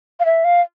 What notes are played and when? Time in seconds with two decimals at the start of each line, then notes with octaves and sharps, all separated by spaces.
0.20 F5
0.25 E5
0.44 F5